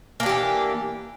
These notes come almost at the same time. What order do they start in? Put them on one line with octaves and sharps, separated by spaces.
A#3 D4 G4 E3